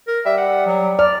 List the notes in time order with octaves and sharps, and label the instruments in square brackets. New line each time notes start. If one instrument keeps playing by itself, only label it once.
[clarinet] A#4
[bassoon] G3 [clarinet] E5
[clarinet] F#5
F#3
[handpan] D5 [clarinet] F6